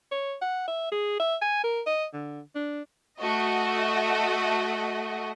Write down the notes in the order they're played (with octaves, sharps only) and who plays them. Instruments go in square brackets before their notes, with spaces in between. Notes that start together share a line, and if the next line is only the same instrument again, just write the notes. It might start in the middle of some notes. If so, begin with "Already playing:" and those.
[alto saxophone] C#5
F#5
E5
G#4
E5
G#5
A#4
D#5
D3
D4
[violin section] A3 F#4 D#5